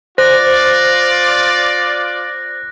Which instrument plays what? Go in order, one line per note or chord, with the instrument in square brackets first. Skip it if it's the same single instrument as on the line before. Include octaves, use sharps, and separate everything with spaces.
[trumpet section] F4 D5 [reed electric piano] C5 [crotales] F#6 A#6